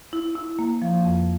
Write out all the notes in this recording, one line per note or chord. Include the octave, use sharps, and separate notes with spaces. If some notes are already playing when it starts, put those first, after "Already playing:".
E4
E4
A#3
F3
F2